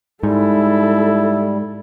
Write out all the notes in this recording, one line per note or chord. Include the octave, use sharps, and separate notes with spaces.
G#2 G3 E4 A4